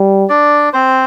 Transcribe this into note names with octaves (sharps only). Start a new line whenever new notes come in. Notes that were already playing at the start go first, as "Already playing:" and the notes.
Already playing: G3
D4 D5
C4 C5